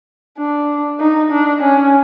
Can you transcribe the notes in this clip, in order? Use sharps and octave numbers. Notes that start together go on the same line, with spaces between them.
D4
D#4
D4
C#4